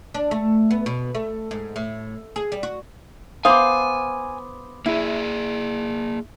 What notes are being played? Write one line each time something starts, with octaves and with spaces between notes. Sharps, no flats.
D4
A3
B3
B2
A3
G#2
A2
G#4
G3
F#4
B3 C5 F5 G#5 D6 D#6
A#3 E4 G#4